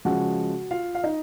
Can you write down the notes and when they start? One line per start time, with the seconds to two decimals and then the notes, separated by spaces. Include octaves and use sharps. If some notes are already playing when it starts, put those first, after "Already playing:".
0.05 C#3 F3 G#3 F#4 F#5
0.71 F4 F5
0.95 F5
1.04 D#4 D#5